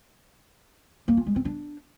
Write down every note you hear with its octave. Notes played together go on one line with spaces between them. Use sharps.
A#3
F4
G#3
C4
D4